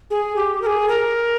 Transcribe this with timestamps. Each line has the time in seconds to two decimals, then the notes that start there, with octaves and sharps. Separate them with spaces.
0.10 G#4
0.36 G4
0.62 A#4
0.66 G#4
0.88 A#4